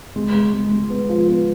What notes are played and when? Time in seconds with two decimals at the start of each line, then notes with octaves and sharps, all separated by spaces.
0.16 G#3
0.34 G#3
0.53 G#3
0.71 G#3
0.90 B3
1.09 F3
1.28 B3